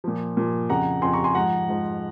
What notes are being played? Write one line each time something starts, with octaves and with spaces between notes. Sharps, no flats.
A#2 F3
A#2 F3
F2 C#3 F3 F#5 A#5
F2 C#3 F3 G#5 C6
A#5 C#6
G#5 C6
G#2 F3 F#5 A#5
G#2 F3